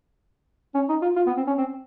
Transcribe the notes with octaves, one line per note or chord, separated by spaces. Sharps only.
C#4
D#4
F4
F4
B3
C4
C#4
C4